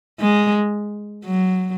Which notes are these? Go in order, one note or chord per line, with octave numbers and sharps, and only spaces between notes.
G#3
F#3